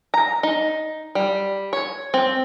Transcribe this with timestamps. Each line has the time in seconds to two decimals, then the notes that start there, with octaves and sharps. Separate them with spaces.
0.14 A#5
0.43 D#4
1.15 G3
1.73 C#5
2.14 C4